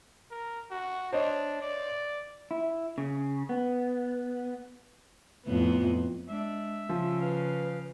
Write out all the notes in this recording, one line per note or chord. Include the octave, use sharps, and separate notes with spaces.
A#4
F#4
D4 C5 C#5 D#5
D5
E4
C#3
B3
F2 A2 B3
G#3 D4 E5
C#3 F3
B4 F5